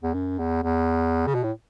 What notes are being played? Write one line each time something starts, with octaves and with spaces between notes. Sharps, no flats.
E2
F#2
E2
E2
C#3
B2
A2